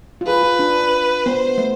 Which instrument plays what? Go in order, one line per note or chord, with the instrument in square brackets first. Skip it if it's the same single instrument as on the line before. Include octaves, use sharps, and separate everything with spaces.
[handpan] F4
[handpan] G#4 [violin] B4
[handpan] F4
D4
[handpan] B3 [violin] C5
[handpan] A3